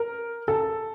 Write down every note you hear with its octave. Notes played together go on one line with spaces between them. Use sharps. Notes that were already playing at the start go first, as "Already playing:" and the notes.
Already playing: A#4
A4